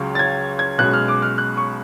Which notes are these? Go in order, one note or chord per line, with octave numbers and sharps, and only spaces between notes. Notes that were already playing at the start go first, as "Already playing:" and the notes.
Already playing: C#2 C#3 F#3 C#4
A6
G#6
G#6
B1 B2 G#3 C#4 F#6
F6
D6
F6
F#6
C#6